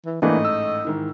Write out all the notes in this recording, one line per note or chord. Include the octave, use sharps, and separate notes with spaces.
E3
A1 G#2 E3 A3 A#3 D4 D#5
E6
G#2 D#3 E3